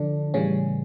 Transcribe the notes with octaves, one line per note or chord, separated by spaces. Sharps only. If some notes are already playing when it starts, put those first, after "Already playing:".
Already playing: D3 F3 D4
A2 C#3 E3 G3 C#4